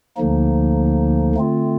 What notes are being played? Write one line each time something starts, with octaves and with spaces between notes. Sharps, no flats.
D2 D3 F3 A#3 D#4
D3 A3 C4 F4